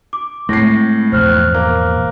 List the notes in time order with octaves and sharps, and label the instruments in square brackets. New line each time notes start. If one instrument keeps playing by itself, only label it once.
[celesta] D6
[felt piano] A2 C7 [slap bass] G#3 C4 [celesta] A#6
[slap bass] A#1 E2 G#2 [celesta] C5 F6 F#6
[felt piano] A#3